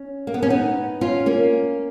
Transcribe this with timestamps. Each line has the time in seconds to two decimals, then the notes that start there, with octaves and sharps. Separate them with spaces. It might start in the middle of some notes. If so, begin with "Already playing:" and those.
Already playing: C#4
0.27 A#3
0.34 B3
0.43 C#4
0.50 B3 D#4
1.01 C#4 F4
1.26 A#3 C#4